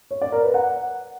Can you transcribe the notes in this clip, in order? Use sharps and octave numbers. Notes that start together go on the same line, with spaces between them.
C#5
D5
A#4
B4
F#5